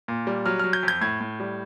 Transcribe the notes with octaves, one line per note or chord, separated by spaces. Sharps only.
A#2
G3
F#3 F6
F#3 F6
G6
F2
G6
A2 G#6
A2
G3